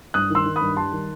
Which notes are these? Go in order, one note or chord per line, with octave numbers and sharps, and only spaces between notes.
G2 D#6 F#6
D#3 C6 E6
D#3
B5 D#6
G2
G3 A5 C6
D#3